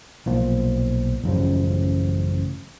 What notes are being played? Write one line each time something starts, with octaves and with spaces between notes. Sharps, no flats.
B1 A#2 F3
A1 F#2 C#3 F3